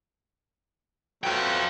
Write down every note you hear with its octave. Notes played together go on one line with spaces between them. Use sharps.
F#3 A3 B3 F4 G5